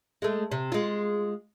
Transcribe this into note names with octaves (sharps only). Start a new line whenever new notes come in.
G#3 A3
C3
G#3 F4